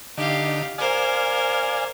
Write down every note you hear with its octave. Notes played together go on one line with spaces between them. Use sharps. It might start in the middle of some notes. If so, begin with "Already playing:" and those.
D3 D#4 G4 F5
A#4 C5 D5 F5 G#5